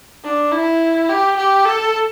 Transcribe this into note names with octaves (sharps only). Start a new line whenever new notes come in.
D4
E4
G4
G4
A4